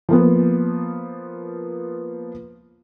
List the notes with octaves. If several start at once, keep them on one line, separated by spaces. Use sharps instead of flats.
F3 A#3 B3